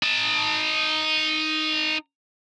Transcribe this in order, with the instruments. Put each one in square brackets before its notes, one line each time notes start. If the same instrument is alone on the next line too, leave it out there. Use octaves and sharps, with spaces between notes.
[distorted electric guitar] D#4 A5